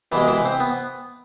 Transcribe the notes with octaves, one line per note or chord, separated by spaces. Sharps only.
C2 B2 E3 G#3 E4
E3 E4
C4
B3